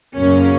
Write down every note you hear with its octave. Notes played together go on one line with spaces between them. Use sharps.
F#2 C#3 F#3 A#3 C#4